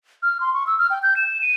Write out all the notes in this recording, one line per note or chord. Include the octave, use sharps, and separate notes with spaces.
F6
C6
C#6
E6
F6
G5
G6
E7
D#7